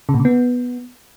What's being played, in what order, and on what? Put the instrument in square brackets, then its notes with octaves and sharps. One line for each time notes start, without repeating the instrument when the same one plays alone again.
[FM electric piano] C#3
A#2
C#3
B3